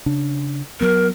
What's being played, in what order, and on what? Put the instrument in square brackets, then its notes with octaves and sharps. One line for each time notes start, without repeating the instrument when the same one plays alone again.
[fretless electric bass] C#3 D4
[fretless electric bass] F#3 B3 [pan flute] A#4